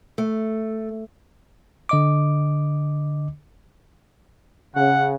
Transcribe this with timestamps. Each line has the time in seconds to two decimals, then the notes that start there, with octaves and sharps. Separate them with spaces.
0.18 A3
1.89 D3 D#5 D6
4.76 C#3 F#5